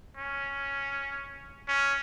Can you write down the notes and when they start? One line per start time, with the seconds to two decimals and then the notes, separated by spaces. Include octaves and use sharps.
0.17 C#4
1.68 C#4